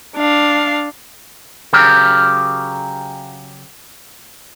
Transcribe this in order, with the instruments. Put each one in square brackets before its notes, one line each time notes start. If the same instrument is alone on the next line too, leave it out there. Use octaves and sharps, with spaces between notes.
[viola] D4 F5
[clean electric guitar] C#3 F#3 G4 A#4